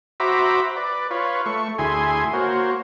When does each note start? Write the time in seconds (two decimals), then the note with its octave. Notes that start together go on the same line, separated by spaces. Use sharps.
0.20 F#4 C5 E5 A#5 B5 D6
0.77 B4 D5
1.11 F4 B4 C#5
1.46 A3 C#6
1.79 D2 E4 G#4 G#5 C6
2.33 A#3 F#4 C5 C#5